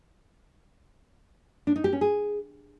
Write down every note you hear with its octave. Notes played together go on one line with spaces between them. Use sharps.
D4
D#4
G4
C#4
G#4